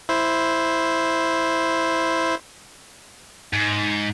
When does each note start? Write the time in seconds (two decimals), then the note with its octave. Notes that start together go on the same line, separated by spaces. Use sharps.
0.09 E4 C5
3.53 G#2